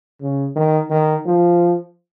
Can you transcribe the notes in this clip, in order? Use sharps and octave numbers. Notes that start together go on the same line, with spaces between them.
C#3
D#3
D#3
F3